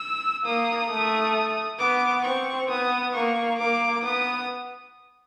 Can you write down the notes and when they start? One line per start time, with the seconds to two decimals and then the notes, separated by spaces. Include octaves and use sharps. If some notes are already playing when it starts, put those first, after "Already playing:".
Already playing: E6
0.45 A#3 D#6
0.90 A3
1.79 B3 D6
2.24 C4 C#6
2.69 B3 D#6
3.14 A#3 C#6
3.59 A#3 D6
4.04 B3 D#6